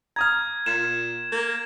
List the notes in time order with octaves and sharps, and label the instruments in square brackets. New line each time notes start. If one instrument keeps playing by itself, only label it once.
[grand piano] A#5 D#6 F6 [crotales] G#6
[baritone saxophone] A#2 [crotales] E7
[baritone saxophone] A#3